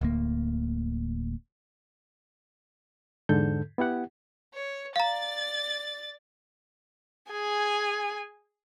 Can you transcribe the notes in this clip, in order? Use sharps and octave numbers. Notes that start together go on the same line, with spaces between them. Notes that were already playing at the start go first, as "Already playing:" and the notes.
D1 D2 A#3
E2 G#2 D3 A4 G6
B3 E4 G4 F#5
C#5
D5 F5 A#5 A6
G#4 G#5